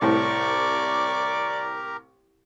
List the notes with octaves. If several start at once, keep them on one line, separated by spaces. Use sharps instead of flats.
C2 A2 G4 A#4 D5 A#5 C#6 D6